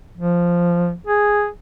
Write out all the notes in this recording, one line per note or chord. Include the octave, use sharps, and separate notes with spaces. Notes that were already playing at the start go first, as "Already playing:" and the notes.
F3
G#4